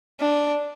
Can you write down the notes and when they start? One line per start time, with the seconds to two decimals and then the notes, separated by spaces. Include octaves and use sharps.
0.20 D4